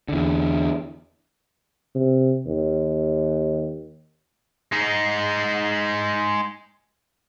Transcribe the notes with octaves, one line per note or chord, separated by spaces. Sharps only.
E2 D3
C3
D#2
G#3 D#4